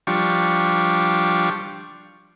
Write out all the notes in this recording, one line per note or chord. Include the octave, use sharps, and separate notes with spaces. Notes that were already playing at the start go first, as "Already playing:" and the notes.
F3 G3 D4 C#6